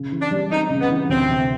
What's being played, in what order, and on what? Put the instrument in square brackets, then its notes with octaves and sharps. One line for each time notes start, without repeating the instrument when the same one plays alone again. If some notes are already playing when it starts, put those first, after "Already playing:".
Already playing: [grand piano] C#3
E3
[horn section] D4
[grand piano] G3
[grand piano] C4 [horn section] D#4
[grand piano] C#3
[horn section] B3
[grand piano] E3
[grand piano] D2 [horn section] C4
[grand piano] C3